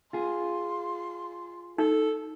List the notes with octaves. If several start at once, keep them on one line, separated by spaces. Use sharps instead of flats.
F4 G#4 C6
D#4 A4